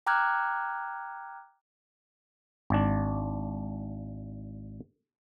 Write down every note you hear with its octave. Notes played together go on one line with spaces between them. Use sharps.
G5 A#5 D6 F6 F#6 G#6
G#1 D4